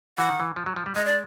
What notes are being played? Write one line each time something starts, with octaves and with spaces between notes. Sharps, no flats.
E3 F#5
D#3
E3
F3
F#3
F3
G3
G#3 D#5
D5